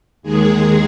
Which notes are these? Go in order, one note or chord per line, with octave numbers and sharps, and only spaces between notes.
D#2 D#3 G#3 G#4